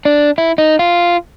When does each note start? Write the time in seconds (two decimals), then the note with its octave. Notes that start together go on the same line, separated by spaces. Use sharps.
0.05 D4
0.38 E4
0.58 D#4
0.79 F4